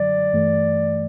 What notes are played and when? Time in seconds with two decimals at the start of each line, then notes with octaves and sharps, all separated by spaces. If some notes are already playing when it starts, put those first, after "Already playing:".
Already playing: F#2 D3 F#3 D5
0.33 G2 E3 A3